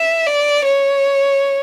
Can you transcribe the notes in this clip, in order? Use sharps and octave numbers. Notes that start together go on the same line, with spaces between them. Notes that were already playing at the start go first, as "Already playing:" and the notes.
Already playing: E5
D5
C#5